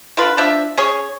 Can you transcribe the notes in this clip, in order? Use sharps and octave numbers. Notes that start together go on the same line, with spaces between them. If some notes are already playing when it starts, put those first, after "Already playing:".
D3 F4 B4
F3 D4 E5
C#4 G#4 C#5